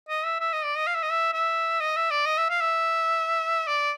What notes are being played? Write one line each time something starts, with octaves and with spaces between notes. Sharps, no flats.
D#5
E5
E5
D#5
D5
D#5
F5
E5
D#5
E5
E5
D#5
E5
D5
D#5
E5
F5
E5
D5